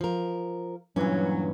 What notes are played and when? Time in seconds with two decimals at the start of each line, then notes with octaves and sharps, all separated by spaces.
0.01 F3 A#4
0.96 G2 A#2 E3 F#3 C#4